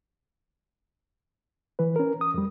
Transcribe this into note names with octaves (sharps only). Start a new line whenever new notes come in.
E3 B4
C#4 A#4
D#6
F2 G3